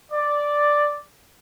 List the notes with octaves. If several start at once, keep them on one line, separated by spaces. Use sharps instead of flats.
D5